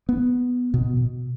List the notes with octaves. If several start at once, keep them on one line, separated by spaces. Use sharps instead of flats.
B3
B2
B2